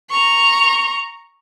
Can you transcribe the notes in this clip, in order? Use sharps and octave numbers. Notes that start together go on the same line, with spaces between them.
A#5 C#6